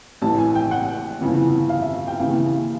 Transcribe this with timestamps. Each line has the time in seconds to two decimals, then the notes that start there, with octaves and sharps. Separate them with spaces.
0.22 A1 A2 E3 A5
0.39 G#5
0.55 G5
0.71 F#5
1.20 G1 F2 C#3 E3
1.69 F5
1.82 E5
2.07 G5
2.19 D#2 C#3 E3 F5